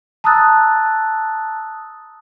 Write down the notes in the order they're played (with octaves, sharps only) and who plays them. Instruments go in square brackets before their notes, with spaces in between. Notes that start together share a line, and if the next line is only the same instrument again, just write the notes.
[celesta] A5 A#5 D#6 E6 F#6 A6